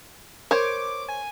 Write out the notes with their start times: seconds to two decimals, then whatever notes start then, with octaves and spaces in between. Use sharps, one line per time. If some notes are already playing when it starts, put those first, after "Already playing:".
0.51 A#4 C5 C#5 D6
1.09 G#5